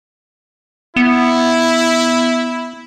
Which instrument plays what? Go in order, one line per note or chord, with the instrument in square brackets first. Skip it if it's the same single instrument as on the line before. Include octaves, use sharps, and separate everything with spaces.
[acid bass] B3 [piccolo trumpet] E4